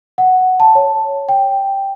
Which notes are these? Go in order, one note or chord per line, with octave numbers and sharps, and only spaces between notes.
F#5
A5
C#5
G5